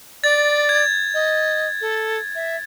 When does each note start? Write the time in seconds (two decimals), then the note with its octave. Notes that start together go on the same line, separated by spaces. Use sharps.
0.24 D5 A6
0.69 G#6
1.14 D#5
1.81 A4
2.35 E5